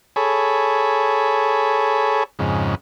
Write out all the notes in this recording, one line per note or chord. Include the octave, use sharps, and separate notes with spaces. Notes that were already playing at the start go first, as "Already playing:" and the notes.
G#4 A4 C#5 B5
F2 G#2 C#3